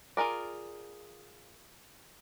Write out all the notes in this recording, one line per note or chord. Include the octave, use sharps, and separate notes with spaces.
F4 G#4 A#4 D5